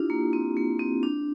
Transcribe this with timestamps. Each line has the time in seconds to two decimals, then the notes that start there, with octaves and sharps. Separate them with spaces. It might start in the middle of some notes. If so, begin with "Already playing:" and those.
Already playing: D4 E4 F4 G4
0.10 A#3
0.33 C4
0.57 A#3
0.79 C4
1.03 D4